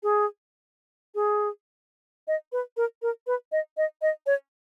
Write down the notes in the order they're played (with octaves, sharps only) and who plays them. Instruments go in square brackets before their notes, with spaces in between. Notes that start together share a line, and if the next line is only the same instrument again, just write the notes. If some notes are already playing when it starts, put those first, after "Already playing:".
[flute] G#4
G#4
D#5
B4
A#4
A#4
B4
D#5
D#5
D#5
C#5